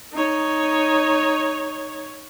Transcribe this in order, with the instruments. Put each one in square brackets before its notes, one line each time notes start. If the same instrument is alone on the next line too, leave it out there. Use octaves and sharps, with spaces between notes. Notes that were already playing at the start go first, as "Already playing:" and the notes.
[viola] D#4 C#5